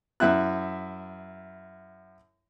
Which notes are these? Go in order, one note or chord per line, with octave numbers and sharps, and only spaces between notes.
F#2 E4 E5 F#6